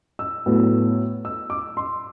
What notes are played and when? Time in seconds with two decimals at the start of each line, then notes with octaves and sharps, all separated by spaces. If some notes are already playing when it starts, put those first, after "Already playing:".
0.19 E6
0.46 A2 F#3 B3
1.25 E6
1.50 D6
1.77 C6